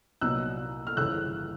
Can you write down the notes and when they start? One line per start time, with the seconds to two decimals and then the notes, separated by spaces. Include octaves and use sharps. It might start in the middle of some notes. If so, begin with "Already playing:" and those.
0.21 C2 A#2 F#3 B3 D#4 E6 F#6
0.87 F6
0.97 G1 F2 C#3 E3 E6 F#6